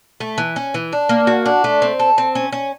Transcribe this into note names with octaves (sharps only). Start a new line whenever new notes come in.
A3
E3
C#4
E3
D4
A#3
F#4
D4
A3
C4
A4
C4
C#4
C#4